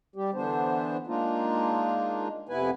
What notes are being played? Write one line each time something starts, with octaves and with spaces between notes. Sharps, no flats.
G3 G4
D3 E3 B3 D4 C5
G#3 A#3 D4 D#4 F4
F2 C3 B3 E4 B4 G#5